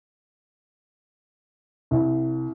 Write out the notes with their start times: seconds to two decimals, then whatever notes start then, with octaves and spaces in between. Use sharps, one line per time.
1.91 C2